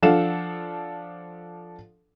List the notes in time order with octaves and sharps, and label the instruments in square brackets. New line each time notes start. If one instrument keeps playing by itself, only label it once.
[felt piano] F3 D4 A4 F5 F#5 E7